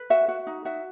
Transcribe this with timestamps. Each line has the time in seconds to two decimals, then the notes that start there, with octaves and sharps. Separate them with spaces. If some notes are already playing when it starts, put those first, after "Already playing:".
Already playing: B4
0.10 F#4 E5
0.28 F#4
0.47 D#4
0.65 F#4 E5